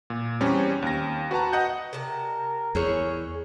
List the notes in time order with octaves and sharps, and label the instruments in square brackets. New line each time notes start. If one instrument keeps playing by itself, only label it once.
[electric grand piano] A#2
E2 G3 C4 C#4
D#2 A#6
F#4 B4 A5 A#5
D#5 F#5 G6
[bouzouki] C3 A5 [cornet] A#4
[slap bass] E2 [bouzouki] G#4 C#5